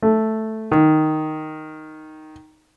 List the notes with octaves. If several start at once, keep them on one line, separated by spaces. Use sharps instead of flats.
A3
D#3